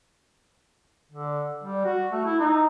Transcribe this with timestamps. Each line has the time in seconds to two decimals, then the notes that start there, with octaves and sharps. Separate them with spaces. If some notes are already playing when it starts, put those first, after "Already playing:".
1.12 D3
1.63 G3
1.85 F#4
2.12 A3
2.25 E4
2.40 D#4